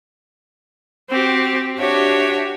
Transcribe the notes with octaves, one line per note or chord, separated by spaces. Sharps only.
C4 F#4 G4
D4 F#4 G4 C#5 E5